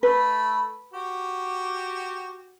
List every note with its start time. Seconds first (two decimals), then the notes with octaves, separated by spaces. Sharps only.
0.03 A3 B4 B5
0.93 F#4 G4